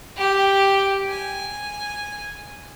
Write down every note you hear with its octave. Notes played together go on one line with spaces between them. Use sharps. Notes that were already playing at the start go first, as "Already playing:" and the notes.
G4 G5
G#5